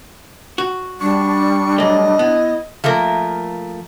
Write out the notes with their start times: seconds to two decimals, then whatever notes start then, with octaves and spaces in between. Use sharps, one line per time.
0.58 F#4
1.01 G3 D4 C#6
1.78 F#3 A3 D#5
2.19 B3 E4
2.84 F3 A3 A#3 A#4